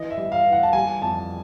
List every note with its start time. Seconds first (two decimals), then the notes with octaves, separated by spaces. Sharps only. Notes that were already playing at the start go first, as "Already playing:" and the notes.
Already playing: E3 D#5
0.10 E5
0.17 G3
0.32 F5
0.45 E3
0.52 F#5
0.63 A5
0.73 G3 G#5
1.01 F2 A5